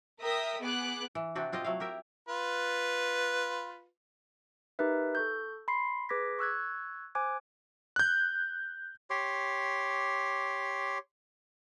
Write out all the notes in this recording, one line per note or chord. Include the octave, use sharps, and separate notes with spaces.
A#4 E5 G5 D#6
B3 G#4 D6 F#6
E3
C3 C4 D4 F#4
C4 F4 G4 D#5
F#3 A3 E4 F5
G4 A#4 E5
F4 B4
D#4 G4 A#4 B4 E5
A4 C#6 G6
B5 C6 C7
G#4 B4 D6 G#6 A#6 B6
C#6 E6 F#6 G#6
C5 G#5 D6 F#6 G#6
F#6 G6
G4 C#5 C6 D6